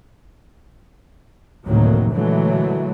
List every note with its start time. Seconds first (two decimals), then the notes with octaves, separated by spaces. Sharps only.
1.66 F1 D2 A2 D#3 F#3 A#3
2.11 A#2 D3 E3 F#3 G#3 A3